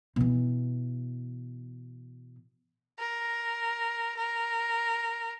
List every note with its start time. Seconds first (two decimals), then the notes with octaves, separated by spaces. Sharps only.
0.16 B2 E3
2.99 A#4
4.17 A#4